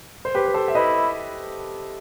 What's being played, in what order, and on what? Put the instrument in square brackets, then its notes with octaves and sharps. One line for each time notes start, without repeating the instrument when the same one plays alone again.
[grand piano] C5
G4 B4
B4
A4 C5
E5
[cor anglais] E4 [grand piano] B4 D#5